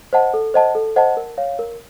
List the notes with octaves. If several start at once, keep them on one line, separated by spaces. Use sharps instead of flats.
C5 D#5 F#5 A5
A4
C5 D#5 F#5 A5
A4
C5 D#5 F#5 A5
A#4
C#5 F5
A#4